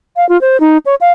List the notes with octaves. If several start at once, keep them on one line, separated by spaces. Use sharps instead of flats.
F5
F4
C5
D#4
C#5
F5